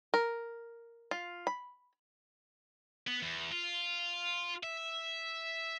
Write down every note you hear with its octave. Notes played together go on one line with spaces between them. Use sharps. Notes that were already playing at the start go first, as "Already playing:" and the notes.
A#4
F4
B5
B3
E2
F4
E5